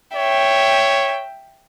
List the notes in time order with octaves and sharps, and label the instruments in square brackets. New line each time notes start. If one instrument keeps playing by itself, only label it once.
[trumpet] C#5 [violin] E5 G5